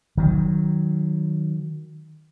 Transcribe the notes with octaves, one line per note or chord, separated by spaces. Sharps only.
D#3 F#3